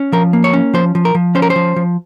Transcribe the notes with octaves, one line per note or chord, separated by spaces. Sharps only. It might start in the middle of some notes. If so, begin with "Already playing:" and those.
Already playing: C#4
F3 A#4
A#3
C#5
C#4
F3 C5
F3
A#4
F3
C#4 C5
A#4
C5
F3
F3